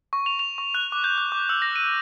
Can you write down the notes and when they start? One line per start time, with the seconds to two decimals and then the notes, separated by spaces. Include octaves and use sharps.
0.13 C#6
0.26 F7
0.39 F7
0.58 C#6
0.74 F#6
0.92 D6
1.04 G6
1.18 F#6
1.32 D6
1.49 E6
1.62 A#6
1.76 D#7